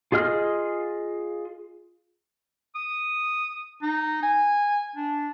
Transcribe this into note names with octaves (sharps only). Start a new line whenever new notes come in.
F4 G#4 D#5 F6
D#6
D#4
G#5
D4